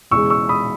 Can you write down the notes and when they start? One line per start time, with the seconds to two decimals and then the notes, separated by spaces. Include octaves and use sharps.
0.11 E1 E2 C#3 G#3 C#6 E6
0.30 C#6 E6
0.49 B5 D#6